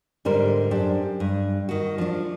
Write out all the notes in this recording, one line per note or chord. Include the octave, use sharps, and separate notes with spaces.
G#2 D3 G3 A#4 C5
F#2 D4 G4 C5
G2
D#3 F#4
F3 D4